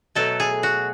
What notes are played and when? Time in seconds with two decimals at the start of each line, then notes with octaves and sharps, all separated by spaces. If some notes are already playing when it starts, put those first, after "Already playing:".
0.15 B2 F#3 A3 A4
0.40 G#4
0.63 F#4